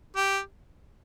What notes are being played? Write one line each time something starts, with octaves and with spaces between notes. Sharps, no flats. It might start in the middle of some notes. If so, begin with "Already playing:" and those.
G4